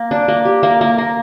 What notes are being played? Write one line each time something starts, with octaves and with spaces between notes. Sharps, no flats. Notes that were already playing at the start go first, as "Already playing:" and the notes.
Already playing: A#3
D4
A#3
G4
A#3
A#3
A#3